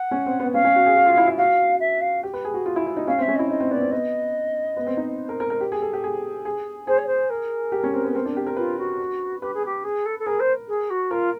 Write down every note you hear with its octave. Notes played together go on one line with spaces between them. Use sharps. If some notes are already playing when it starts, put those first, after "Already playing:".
Already playing: F#5
C#4
C4
B3
C#4 F5
C#4
F#4
G#4
F#4
F4
E4
E4
F#4 F5
E5
F5
G4
B4
G#4
F#4
F4
E4
E4
D#4
C#4 F5
C4 E5
C#4
E4 D#5
D#4 D#5
C4
B3 D5
C4
B3 D#5
B3
C4
D#4
A#4
A#4
A#4
G4
G#4
A4
G4
G#4
G#4
G#4 C5
C#5
C5
A#4
G4
C#4
C4
B3
C4
D4
G4
A#4
F4 B4
F#4
G4 B4
G#4
G4
G#4
A4
A4
G#4 A#4
C5
G#4
F#4
F4 A#4